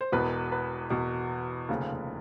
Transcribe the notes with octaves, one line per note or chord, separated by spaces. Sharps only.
C5
E1 E2 B2 B4
B4
E1 E2 B2
F1 D#2 C#3 F3